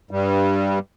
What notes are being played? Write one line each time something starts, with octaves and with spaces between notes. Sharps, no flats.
G2 G3